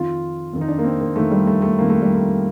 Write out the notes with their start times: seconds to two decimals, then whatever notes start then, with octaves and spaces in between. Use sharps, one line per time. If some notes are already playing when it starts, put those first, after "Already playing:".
Already playing: F2 D#3 F4
0.53 F2 D#3
0.61 D#4
0.68 D4
0.79 A#3
0.84 C4
1.00 A#3
1.15 F2 D#3 A3
1.31 G3
1.47 A3
1.62 A3
1.79 F2 D#3 A#3
1.90 A3
2.02 G3
2.14 A3